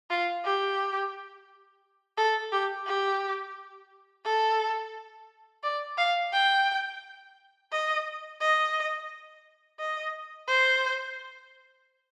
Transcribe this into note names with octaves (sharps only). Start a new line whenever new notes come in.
F4
G4
A4
G4
G4
A4
D5
F5
G5
D#5
D#5
D#5
C5